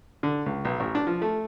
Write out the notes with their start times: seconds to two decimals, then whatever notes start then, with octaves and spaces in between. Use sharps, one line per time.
0.23 D3
0.46 C#2
0.65 B1
0.80 A1
0.95 D4
1.07 F3
1.22 A3